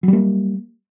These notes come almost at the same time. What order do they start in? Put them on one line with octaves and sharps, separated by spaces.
F#3 G3 A#3